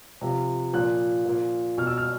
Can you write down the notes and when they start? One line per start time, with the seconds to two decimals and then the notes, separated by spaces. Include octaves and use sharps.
0.21 C3 F3
0.73 A#2 F3 F#6
1.25 A#2 F3
1.78 B2 F6
1.87 E6
1.97 F6